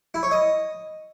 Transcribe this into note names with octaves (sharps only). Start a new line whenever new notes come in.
E4
C#5
D#5